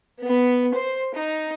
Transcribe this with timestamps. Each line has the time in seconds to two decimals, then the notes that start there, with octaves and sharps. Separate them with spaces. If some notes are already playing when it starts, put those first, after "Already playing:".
0.24 B3
0.75 C5
1.16 D#4